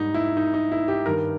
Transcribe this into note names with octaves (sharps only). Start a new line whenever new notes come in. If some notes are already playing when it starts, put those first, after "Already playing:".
Already playing: G#2 G3 D#4
E4
D#4
D#4
E4
G4
G2 D#3 G3 A#4